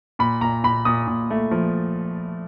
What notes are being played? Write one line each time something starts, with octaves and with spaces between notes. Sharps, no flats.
A#2 B5
A#2 A#5
A#2 B5
A#2 D#6
A#2
A3
F3